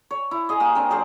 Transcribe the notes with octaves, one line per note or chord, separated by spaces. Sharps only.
C#5
E4
G#4 D#5
A#3 G4
C4 D4 A#4
F#3 G#4 C5 D5